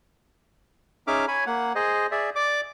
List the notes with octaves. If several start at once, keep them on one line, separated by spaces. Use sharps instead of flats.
C#4 D#4 G#4 E5 D6 F6
C#5 G#5 B5
A#3 F#5
G#4 C5 D#5
G#4 D5 E5
D5 D6